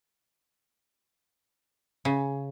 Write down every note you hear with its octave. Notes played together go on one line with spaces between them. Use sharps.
C#3